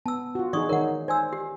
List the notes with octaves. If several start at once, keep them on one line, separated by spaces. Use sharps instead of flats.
B3 A5 E6
F4 F#4
E3 D#4 G#4 D5 C#6 D#6
D#3 D#4 A#4 C#5 F#5
C5 D5 G#5 E6
G4